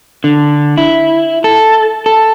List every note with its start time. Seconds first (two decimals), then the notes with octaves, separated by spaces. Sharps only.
0.24 D3
0.78 E4
1.44 A4
2.06 A4